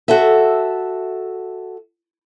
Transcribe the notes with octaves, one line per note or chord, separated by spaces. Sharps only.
F#4 A4 E5